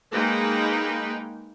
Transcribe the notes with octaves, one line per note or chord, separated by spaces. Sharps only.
G#3 A#3 D#4 B4 G5